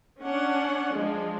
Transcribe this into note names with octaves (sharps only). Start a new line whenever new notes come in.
C#4 D4 F#5
F3 G#3 D4